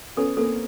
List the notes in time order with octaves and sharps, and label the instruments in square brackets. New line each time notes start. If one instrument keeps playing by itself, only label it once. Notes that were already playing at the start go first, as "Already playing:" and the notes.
[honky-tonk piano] B3 C#4 [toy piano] A4
[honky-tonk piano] A#3 C4 [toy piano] A4